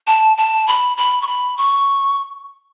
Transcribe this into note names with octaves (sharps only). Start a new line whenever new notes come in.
A5
A5
B5
B5
C#6
B5
C#6